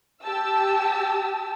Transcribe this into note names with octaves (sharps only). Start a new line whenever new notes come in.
G4 A5 E6